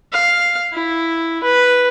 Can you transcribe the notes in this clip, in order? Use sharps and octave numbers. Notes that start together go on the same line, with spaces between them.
F5
E4
B4